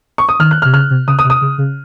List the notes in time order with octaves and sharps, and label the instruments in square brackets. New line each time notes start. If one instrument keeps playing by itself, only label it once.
[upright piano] C#6
D#6
[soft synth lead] D#3 [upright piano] F6
[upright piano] F#6
F6
[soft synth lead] C3
[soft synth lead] C#3 [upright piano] F6
[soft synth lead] C3
[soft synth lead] C#3 [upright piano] D#6
[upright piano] D#6
[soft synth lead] C3
[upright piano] D#6
[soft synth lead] C#3
C#3